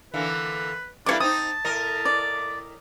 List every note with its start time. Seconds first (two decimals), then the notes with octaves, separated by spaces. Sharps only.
0.14 D3 E3 A#3 B4
1.06 G3 A3 A#3 D4 E4 C#5 D6
1.20 C4 D#4 A5 D#6
1.65 A2 A#4 D#5
2.05 D5